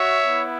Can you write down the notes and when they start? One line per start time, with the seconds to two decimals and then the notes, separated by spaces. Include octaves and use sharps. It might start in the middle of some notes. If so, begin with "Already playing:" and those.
Already playing: F#4 C#5 E5
0.25 B3 E4